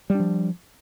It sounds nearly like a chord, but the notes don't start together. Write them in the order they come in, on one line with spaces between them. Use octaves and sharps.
G3 D4 F3